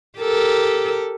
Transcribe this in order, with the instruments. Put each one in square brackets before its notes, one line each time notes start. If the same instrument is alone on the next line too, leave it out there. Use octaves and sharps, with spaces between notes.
[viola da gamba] G4 A4 A#4